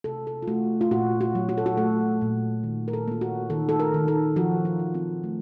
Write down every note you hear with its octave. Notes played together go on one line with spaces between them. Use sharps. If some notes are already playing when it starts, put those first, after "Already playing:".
C3 A4
A4
F4
A3 F#4
F4
A#2 F#4
F#4
F#3
F#4
A4
F#4
A3 A4
A#2
D#3
A#4
A4
A#3 F4
F#4
D#3 A4
A4
A#4
D#3
A4
F3 F#4
F4
F3
C4
A3